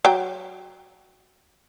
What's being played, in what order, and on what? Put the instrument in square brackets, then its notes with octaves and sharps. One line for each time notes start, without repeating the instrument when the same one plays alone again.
[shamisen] F#3 G5